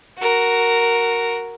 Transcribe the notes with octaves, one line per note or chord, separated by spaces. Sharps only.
F#4 A#4